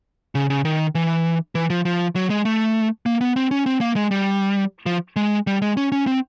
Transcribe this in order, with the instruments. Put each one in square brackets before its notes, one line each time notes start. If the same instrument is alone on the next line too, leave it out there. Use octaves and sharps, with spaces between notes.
[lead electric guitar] C#3
C#3
D#3
E3
E3
F3
F3
F#3
G#3
A3
A#3
B3
C4
C#4
C4
A#3
G#3
G3
F3
G#3
G3
G#3
C#4
C#4
C4